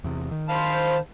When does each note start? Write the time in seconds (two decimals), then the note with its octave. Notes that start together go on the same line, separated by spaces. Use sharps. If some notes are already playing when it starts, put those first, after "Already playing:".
0.04 E2 C3
0.31 D#3
0.50 C5 F5 A5 B5